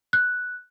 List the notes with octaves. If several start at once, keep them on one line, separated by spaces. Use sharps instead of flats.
F#6